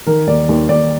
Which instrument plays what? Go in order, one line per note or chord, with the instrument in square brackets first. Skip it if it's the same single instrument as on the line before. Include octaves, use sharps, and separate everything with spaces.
[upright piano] D#3 A#4
D#2 D5
D#2
D#2 D5